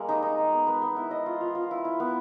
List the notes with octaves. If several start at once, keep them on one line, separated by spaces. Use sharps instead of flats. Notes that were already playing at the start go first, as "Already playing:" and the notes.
Already playing: G3 G#3 A#3
D#4
D#4
G#3
B3
B3
B3
E4
D#5
F4
F4
F4
E4
E4
B3